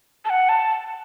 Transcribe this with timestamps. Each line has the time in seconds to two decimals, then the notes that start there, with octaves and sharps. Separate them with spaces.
0.25 A5
0.30 F#5
0.49 A5